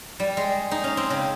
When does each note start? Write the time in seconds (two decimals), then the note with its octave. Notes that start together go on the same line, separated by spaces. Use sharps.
0.20 G3
0.37 G#3
0.71 D#4
0.84 C#4
0.97 C4
1.10 C#3